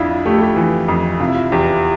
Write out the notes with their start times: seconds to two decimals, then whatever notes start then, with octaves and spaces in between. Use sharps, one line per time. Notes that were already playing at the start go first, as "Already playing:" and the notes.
Already playing: F2 D4 E4 F4
0.25 A3 G4
0.34 A4
0.41 G4
0.56 E3
0.88 F2
1.20 C3 F4
1.27 E4
1.35 F4
1.52 E2 G4